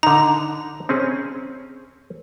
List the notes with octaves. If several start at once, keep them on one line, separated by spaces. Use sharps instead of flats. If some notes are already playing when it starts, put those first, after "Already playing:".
D3 D#4 A#5
C4 C#4 G#4